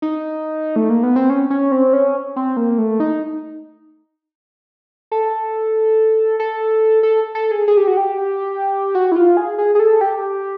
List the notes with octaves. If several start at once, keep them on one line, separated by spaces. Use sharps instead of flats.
D#4
A3
A#3
B3
C4
C#4
C#4
C4
C#4
C4
A#3
A3
D#4
A4
A4
A4
A4
G#4
G#4
G4
F#4
G4
F#4
E4
F4
G#4
G#4
G#4
A4
G4